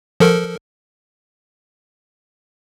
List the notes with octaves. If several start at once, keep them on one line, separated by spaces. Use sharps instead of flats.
F3 A4 A#4